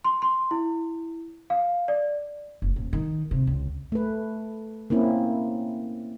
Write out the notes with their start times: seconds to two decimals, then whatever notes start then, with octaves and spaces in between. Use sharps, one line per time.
0.04 C6
0.22 C6
0.51 E4
1.50 F5
1.88 D5
2.62 F#1
2.76 D#1
2.93 D#3
3.31 C3
3.47 C#2
3.92 A3 B4
4.90 A#3 C4 C#4 E4